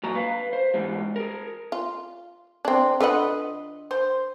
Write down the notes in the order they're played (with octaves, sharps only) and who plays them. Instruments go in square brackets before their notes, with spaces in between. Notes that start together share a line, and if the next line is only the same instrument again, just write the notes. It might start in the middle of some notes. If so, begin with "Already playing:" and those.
[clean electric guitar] A#2 F#3 A#5
B4 F5
C5
E2 G#2 G3
G#4 A#4
[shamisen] F4
C4 D4
[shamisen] D3 F#5 [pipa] F4 B4 D#5
[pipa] C5